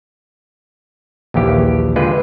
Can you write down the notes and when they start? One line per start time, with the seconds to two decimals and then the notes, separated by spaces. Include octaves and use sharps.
1.34 A#1 D#2 E3 G4 F5
1.96 D3 G#3 F4 B4 G5